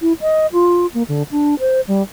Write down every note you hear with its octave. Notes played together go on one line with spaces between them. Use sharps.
E4
D#5
F4
A#3
D3
D4
C5
G3